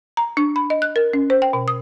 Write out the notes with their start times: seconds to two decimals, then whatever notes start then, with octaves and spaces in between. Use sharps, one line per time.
0.17 A#5
0.37 D4
0.56 B5
0.70 D#5
0.82 F#6
0.96 A#4
1.13 C#4
1.30 C5
1.42 G5
1.53 B2
1.68 D#6